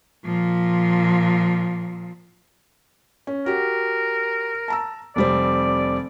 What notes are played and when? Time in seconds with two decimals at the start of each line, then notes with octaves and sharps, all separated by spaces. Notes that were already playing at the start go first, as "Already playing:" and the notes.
0.25 A#2 F3
3.27 C#4
3.46 F#4 G4 A#4
4.68 A5 A#5 E6
5.16 F1 G3 C4 D5